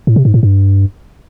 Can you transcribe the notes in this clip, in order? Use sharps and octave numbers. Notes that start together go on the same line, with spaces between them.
A2
C3
G#2
A2
G2